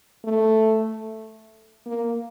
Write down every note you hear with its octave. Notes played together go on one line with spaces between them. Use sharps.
A3
A#3